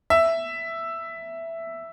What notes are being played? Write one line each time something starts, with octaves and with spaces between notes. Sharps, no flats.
E5